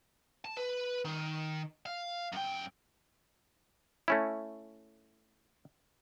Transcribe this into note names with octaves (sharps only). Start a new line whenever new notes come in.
A5
B4
D#3
F5
F#2 G5
A3 C#4 E4